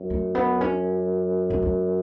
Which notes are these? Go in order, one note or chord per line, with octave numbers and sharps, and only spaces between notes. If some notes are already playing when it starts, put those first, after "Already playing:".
Already playing: F#2
A3
B3
C#4
C4
C#4